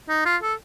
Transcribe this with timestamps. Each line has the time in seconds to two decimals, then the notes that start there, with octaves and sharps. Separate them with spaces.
0.09 D#4
0.25 F4
0.42 A4